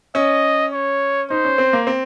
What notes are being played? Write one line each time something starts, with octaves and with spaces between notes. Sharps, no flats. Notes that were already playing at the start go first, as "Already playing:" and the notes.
C#4 D#5
C#5
D#4 C5
C#4
C4
A#3
C4